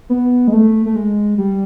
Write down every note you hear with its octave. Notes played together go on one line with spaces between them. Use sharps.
B3
G#3
A3
A3
G#3
G3